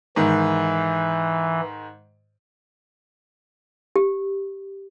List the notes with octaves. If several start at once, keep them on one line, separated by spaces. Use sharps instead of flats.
G#2 D#3 E3
G4